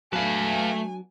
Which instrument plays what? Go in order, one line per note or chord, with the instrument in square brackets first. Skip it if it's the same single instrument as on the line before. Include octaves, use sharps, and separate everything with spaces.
[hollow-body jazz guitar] F#3 B3 D4 [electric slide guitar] A3 A5 [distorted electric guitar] B4 F5 [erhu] G#5